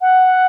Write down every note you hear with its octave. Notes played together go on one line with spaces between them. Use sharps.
F#5